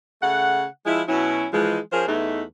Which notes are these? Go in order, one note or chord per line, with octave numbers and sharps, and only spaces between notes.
C#3 A3 F#5
F3 G#3 E4
B2 F#3 C#4 E4
E3 F3 G#3
F3 C#4 G#4 A#4 C5
E2 E3 A3 D#4